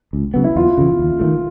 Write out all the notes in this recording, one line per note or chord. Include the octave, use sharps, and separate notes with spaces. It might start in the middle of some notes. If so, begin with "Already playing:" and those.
C#2
C#3 F#3 B3
E4
E2 F4
C#3 E3
D#2
D#3 F#3 A3